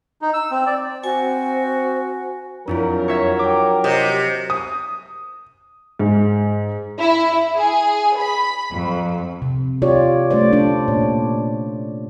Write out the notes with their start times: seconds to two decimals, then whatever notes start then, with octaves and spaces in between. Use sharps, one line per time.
0.22 D#4
0.34 E6
0.51 C4
0.67 D5
1.04 C4 F#4 C5 G#5
2.68 F2 F#3 D4 E4 F4 A#4
3.08 C#5 E5 G#6
3.39 G5 D6
3.84 C3 G4 D#5
4.50 D#6
5.99 G#2
6.98 E4
7.56 G#4
8.17 B5
8.72 F2
9.42 C3
9.82 F4 G4 C#5 D5
10.31 A3 C#4 C5 D5
10.53 D4
10.88 A#2 C#5